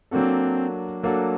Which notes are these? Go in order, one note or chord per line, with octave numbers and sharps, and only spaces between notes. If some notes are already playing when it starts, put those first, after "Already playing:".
F#3 A#3 C4 D4 F#4 A4
F#3 A#3 D4 F#4 A4